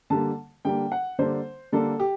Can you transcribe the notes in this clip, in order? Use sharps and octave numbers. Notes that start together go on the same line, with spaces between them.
D3 G3 A#3 A5
D3 G3 A#3 G5
F#5
D3 G3 A#3 D4 C5
D3 G3 A#3 D4 A4
G4